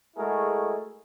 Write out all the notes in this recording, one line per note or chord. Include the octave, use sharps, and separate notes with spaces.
G#3 A3 E4 F#4 G#4 A#4